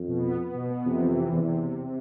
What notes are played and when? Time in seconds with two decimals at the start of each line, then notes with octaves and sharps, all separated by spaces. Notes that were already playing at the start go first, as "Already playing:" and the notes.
Already playing: F2
0.08 B2
0.23 B3
0.39 B3
0.54 B2
0.70 B3
0.85 F2 C3
1.00 E3
1.16 C3
1.32 E2 C3
1.48 C3
1.63 C3
1.79 C3